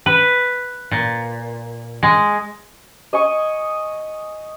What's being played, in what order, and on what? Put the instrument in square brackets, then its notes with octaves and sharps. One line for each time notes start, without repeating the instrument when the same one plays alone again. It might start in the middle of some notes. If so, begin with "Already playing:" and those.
[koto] B4
A#2
G#3
[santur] D#5 G#5 C#6